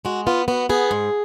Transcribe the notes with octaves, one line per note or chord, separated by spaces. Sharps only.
G#3 F#4
B3 F4
B3 F#4
B3 G#4
G#2